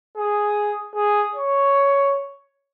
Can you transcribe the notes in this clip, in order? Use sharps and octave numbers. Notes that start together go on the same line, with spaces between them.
G#4
G#4
C#5